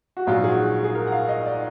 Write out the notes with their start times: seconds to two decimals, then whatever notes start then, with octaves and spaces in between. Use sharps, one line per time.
0.17 F#4
0.27 A#1 G#2 F#3 F4
0.44 G#4
0.49 F#4
0.84 G#4
0.95 A#4
1.07 F#5
1.12 F5
1.29 D#5
1.46 D5